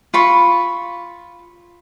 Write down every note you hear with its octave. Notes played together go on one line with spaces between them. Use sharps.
F4 B5 C#6